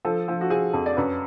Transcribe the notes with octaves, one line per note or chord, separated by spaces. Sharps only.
F3 A4
F3
F#4
F3 G#4
F2
D5
F#2 B4